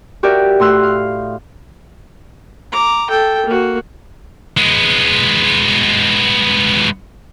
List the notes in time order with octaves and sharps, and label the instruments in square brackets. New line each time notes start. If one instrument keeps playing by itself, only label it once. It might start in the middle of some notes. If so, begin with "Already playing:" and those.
[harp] F#4 G4 A#4 D5 E5
A2 C6 E6 F#6
F5
[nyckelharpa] A#5 D6
A4 G5
A#3 F#4
[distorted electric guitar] G#3 B3